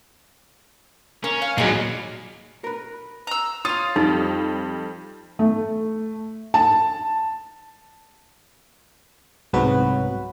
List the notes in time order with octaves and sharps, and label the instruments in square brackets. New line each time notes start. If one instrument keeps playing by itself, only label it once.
[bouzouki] A#3 [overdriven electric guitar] C#4
[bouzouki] F5
[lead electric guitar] A#2 F#3 [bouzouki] D#3 G#3 [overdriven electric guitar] A#3 B3
[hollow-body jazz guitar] A#4 B4
[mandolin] A#5 E6
[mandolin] F4 F5 [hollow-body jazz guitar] C#5 [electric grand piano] D#6
[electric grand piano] F2 [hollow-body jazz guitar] G3 [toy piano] D#4
[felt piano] A3
A5
[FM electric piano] C2 G#2 F#3 B3 F#4 B4